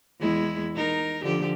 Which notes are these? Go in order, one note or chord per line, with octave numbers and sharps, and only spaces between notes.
E2 G#3 E4
D#4 A#4
D3 F3 G4